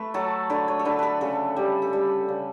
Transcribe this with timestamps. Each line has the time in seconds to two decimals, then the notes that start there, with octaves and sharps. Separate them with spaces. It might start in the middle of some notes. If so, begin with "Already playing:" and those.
Already playing: A3 B4
0.14 F#3 A4
0.50 D3 B4
0.68 C#5
0.79 A4
0.85 D3 B4
0.99 A4 B4
1.21 C#3 A4
1.56 G3
1.82 A4
1.93 G3 B4
2.28 C#3